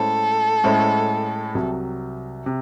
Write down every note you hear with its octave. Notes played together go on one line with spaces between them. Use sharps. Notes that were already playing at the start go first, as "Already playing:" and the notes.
Already playing: A2 G#3 C#4 E4 A4 C5
A2 G#3 C#4 E4 C5
C2 C3 F#3
C3